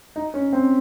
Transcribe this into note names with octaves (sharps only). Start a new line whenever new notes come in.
D#4
C#4
C4